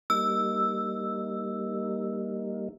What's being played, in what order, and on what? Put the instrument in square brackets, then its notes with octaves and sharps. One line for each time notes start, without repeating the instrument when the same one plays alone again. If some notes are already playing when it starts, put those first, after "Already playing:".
[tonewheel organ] G3 A#3 D#4 [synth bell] E6